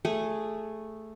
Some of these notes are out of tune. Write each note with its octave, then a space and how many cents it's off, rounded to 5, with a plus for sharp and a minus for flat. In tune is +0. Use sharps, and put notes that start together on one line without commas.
A3 +0 G#4 -10